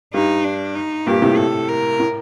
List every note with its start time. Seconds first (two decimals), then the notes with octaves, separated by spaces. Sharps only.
0.14 G2 D#4
0.44 D4
0.75 D#4
1.06 G2 A#2 G4
1.22 A2 C3
1.37 A4
1.69 A#4
2.00 A2